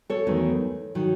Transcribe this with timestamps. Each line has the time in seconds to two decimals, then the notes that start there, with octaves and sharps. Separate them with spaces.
0.10 A4 C#5
0.27 E2 D#3 F#3 A3
0.95 D#3 F#3